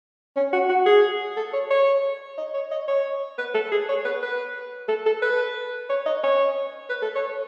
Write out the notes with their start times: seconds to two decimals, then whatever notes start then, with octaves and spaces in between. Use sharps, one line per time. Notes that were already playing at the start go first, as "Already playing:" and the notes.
0.37 C#4
0.53 F#4
0.70 F#4
0.86 G#4
1.37 A4
1.54 C#5
1.71 C#5
2.38 D#5
2.54 C#5
2.71 D#5
2.88 C#5
3.39 B4
3.55 A4
3.72 G#4
3.89 C#5
4.05 B4
4.23 B4
4.89 A4
5.06 A4
5.23 B4
5.90 C#5
6.06 D#5
6.24 C#5
6.90 B4
7.02 A4
7.16 C#5